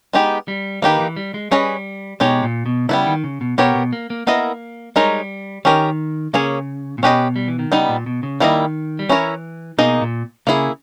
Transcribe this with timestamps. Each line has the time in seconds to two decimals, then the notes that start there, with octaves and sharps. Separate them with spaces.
0.13 G#3 B3 D#4 G4
0.48 G3
0.82 D#3 A#3 D#4 G4 B4
1.00 E3
1.16 G3
1.34 G#3
1.51 G3 C#4 G#4 B4 D#5
2.20 B2 G#3 D#4 G4 C#5
2.43 A#2
2.66 B2
2.89 C#3 G3 B3 E4
3.07 D#3
3.24 C#3
3.41 B2
3.58 B2 B3 G4 A#4 C#5
3.75 B2
3.93 A#3
4.10 A#3
4.27 A#3 B3 E4 A#4 D#5
4.96 G3 G#3 D#4 A#4 C#5
5.65 D#3 C#4 G4 A#4 D#5
6.33 C#3 A#3 C#4 G#4 C#5
6.98 A#2
7.03 B2 C#4 G4 B4 D#5
7.36 G3
7.48 E3
7.59 D#3
7.72 C#3 G3 B3 D#4
7.89 A#2
8.06 B2
8.23 C#3
8.40 D#3 G3 A#3 E4 G#4 D#5
8.99 G3
9.09 E3 C#4 E4 A#4 C#5
9.78 B2 A#3 D#4 G#4 D#5
10.01 A#2
10.47 C#3 A#3 E4 G#4